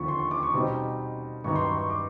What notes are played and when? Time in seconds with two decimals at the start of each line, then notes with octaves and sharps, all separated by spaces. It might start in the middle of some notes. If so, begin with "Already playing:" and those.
Already playing: D#2 D3 F3 B5 C#6
0.08 C6
0.19 C#6
0.31 D6
0.38 C6
0.43 C#6
0.54 B2 G3 C4 D#4 D6
1.44 G2 D#3 F#3 B3 D#4 C#6
1.56 C6
1.66 C#6
1.78 C#6
1.90 D6